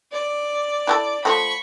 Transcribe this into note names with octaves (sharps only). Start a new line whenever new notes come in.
D5
E4 F#4 A4
F3 A3 F#4 B5 C#6